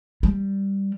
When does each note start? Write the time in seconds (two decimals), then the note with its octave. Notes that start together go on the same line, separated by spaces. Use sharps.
0.23 G3